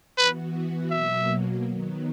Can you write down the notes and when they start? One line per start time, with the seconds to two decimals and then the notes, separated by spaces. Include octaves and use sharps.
0.18 E3 B3 F#4 B4
0.91 B2 F#3 A#3 E5
1.64 D#3 F#3 B3